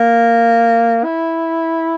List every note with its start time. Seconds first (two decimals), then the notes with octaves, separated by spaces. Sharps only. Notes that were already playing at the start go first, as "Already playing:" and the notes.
Already playing: A#3
1.04 E4